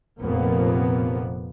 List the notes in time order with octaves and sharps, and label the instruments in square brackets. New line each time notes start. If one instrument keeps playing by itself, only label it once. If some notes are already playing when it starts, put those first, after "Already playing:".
[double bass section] F1 F2 A#2 F3 A#3 B3